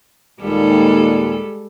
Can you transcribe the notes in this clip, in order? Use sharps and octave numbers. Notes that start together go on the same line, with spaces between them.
D#2 A#2 D#3 G3 G#3 A4